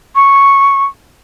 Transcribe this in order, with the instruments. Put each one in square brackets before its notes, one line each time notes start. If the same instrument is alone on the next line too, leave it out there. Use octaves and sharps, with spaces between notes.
[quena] C#6